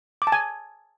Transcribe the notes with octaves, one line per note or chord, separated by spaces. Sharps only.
D6
A5
G#5